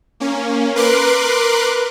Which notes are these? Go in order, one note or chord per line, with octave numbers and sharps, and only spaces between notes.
A#3 C#4
A#4 B4 C6 D6 F#6